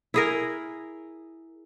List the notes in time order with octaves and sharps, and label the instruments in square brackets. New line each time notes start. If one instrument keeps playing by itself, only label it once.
[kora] E4 G#4 A#4